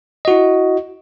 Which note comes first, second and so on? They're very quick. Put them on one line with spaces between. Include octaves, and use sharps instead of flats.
D#5 F#4 E4